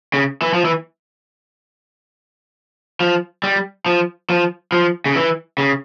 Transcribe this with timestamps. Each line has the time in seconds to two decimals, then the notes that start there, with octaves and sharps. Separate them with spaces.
0.14 C#3
0.42 E3
0.54 F3
0.65 E3
3.01 F3
3.44 G3
3.86 F3
4.30 F3
4.72 F3
5.06 C#3
5.15 E3
5.58 C#3